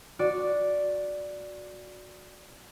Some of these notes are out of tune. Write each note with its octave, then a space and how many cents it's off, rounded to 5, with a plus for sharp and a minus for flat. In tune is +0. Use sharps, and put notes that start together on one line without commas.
F#4 -15 D5 +0